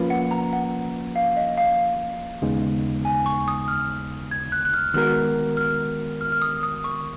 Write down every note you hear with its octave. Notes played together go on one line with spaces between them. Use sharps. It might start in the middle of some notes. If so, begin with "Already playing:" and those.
Already playing: F3 A#3 C#4 F4 B4
F#5
A#5
F#5
F5
D#5
F5
D#2 C#3 G#3 B3 D#4
G#5
C#6
D#6
F6
G#6
F#6
F#6
F6
D#3 G#3 B3 F#4 A#4 F6
F6
F6
F6
D#6
D#6
C#6